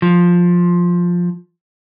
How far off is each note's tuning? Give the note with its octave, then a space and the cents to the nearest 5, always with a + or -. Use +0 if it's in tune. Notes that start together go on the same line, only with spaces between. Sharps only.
F3 +10